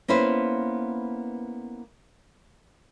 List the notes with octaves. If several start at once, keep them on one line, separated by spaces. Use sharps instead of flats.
A#3 B3 C#4 E4 B4 C5